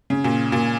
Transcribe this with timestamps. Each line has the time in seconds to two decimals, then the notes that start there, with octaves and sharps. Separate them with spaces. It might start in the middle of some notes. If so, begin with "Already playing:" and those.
0.10 C#3
0.24 A#2
0.52 A#2